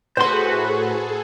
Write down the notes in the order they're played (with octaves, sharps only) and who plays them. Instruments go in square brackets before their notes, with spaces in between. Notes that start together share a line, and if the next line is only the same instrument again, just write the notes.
[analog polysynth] A2 F#4 B4 [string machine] G#4 A4 [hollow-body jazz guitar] C5 C6